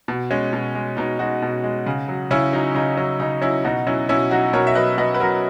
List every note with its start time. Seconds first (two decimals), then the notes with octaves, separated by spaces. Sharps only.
0.08 B2
0.31 G#3 C#4
0.53 B2
0.75 G#3
0.97 B2 D#4
1.19 G#3 D#4 F#4
1.42 B2
1.63 G#3
1.86 C#3
2.08 F#3
2.31 C#3 C#4 E4
2.52 F#3 D#4
2.75 C#3 D#4
2.97 F#3 C#4
3.19 C#3 D#4
3.41 F#3 C#4 E4
3.64 B2 D#4 F#4
3.87 F#3 C#4 E4
4.09 B2 C#4 E4
4.31 F#3 D#4 F#4
4.53 B2 A#4 C#5
4.67 E5
4.75 F#3 B4 D#5
4.98 B2 B4 D#5
5.14 B4
5.20 F#3 F#4 A#4